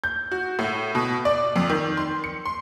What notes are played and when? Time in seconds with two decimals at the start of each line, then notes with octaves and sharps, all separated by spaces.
0.04 G6
0.32 F#4
0.59 A2
0.95 B2
1.25 D5
1.56 F2
1.70 D#3
1.97 C6
2.24 C#7
2.46 C6